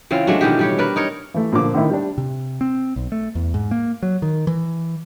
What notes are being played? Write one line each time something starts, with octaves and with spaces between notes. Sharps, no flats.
C#3 E3 C4 F4
G#3 A3 D4 F#4
B2 D#3 E3 G4
G3 G4 C#5
D4 A#4 B4 D5
D#4 A#4 C#5
E3 A3
A#2 D3 F3 A#3 C5 D6
D3 D#3 A3 D#4 E4
G3 D4
C3
C4
B1
A3
E2
G#2
A#3
F#3
D#3
E3